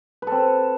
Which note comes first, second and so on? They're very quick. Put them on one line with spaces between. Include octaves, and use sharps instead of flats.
B4 A4 C4